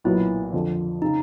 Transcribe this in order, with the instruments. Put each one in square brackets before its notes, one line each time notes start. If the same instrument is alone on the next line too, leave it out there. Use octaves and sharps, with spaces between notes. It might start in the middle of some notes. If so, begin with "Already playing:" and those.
[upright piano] B1 A#2 F#3 B3 [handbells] E4
[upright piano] F2 D3 F3
[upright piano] C#3 [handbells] D#4